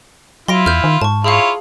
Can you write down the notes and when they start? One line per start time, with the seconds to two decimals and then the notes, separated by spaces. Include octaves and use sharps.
0.48 F#3 E4 F4 C6 A#6 D7
0.66 E2 F6 G6
0.84 D#3
1.02 G#2 A5 C#6
1.24 E4 F4 G#4 C#5 F5